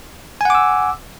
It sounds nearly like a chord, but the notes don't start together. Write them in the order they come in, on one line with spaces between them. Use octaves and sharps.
G#5 F#5 D6 E6